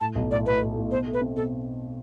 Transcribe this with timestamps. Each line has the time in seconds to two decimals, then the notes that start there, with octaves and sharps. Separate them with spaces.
0.01 A2 A5
0.15 B1
0.31 A2 D5
0.46 A2 B4
0.61 A2
0.76 A2
0.91 B2 C5
1.07 A3
1.13 B4
1.21 C4
1.36 B2 A4